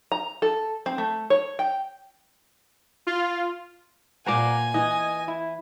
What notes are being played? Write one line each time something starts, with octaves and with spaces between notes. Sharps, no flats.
A#5
A4
C4
A3
C#5
G5
F4
A#2 C5 F#5 G#5 A#5 D6
E3 D#5
E4